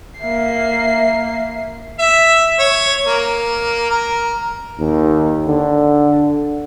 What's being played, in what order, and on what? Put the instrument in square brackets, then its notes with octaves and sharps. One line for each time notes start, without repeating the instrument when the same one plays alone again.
[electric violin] A#3 C7 [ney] E5
[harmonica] E5
C#5
A#3
A#4
[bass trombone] D#2
D3